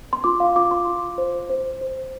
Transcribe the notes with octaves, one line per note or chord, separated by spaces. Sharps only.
C6
F4 D6
F5
F4 D6
C6
F4
C5
C5
C5